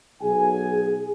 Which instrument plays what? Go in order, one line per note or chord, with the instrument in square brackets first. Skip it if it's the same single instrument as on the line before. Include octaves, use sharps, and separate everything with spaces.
[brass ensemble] B1 G#5 [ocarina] G#4